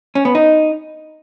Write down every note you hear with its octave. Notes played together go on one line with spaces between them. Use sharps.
C#4
B3
D#4